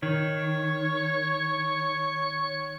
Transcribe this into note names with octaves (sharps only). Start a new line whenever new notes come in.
D#3 C#5